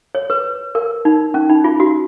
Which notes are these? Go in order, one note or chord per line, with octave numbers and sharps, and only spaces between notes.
C#5
B4
A#4
D#4
C#4
D#4
F4
F#4